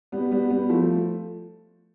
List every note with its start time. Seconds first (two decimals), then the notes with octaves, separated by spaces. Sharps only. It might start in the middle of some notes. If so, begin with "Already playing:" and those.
0.12 G3 B3
0.31 G3 B3
0.50 G3 B3
0.69 F3 A3